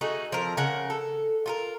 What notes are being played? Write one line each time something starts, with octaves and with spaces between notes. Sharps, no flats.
A3 D#4 F#4 G#4
F3 C4 A#4
C#3 A#4 F#5
A4
F4 A4 A#4